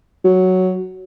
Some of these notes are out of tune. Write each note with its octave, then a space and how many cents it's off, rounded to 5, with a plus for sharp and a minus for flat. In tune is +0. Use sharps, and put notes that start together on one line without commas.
F#3 +0